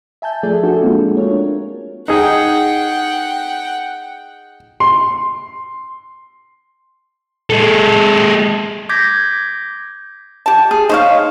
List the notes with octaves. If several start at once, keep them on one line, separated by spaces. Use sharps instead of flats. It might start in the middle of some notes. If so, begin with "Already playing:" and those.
E5 G#5 A5 G6
F3 A3 G#4 D5 E5
D4 F#4 A4
G#3 A#3 C4 D4 F4
D4 A#4 C#5
D#4 G#4 F#5 G5
C6
G#3 A4
D6 G6 G#6 A#6 B6
G4 A5
G#4
D#4 C5 C#5 F5